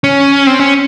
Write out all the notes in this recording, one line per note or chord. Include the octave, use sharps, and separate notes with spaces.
C#4
C4
C#4